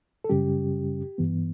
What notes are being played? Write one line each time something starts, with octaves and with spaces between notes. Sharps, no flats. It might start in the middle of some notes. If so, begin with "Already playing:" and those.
A4
F#2 C#3 G3 C#4 G4
G2 E3 B3